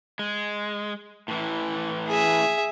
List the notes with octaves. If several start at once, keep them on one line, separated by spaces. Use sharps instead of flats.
G#3
A2 E3
G#4 E5